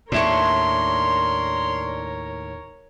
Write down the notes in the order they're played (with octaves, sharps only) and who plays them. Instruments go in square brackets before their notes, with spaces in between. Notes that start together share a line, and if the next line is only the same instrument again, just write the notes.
[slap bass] D#2 A2 [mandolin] D4 E4 C#6 [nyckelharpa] A#4 C#5 [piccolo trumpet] C6